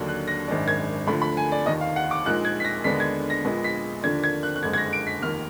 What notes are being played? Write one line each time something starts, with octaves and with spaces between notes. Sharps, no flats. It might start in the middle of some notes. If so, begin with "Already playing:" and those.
Already playing: D#2 D3 F#3 A#3 D4
F#6
A#6
G#1 F#2 D#3 G#3 D4
G#6
D2 D3 F3 B5
B5
G#5
D5
F1 D#2 D#3 D#5
F5
F#5
D6
A#1 A#2 G#3 D#4 F#6
G#6
B6
A#6
D#2 D3 G#3 B3 D4 B6
G#6
A#6
A#1 A#2 G#3 B3
B6
D#2 D3 F3 A#3 D4 G#6
G#6
F#6
F#6
F#1 F2 D3 G#3 G#6
G#6
A#6
D7
B6
F1 D#2 D#3 A#3 F6